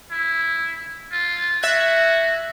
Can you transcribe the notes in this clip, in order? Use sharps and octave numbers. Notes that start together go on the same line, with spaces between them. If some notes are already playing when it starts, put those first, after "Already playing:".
E4
F4
F#4 E5 F#6 G#6